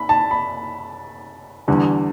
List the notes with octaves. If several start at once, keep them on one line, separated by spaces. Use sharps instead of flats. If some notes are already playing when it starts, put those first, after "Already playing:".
Already playing: B5
A5
B5
E2 D3 G3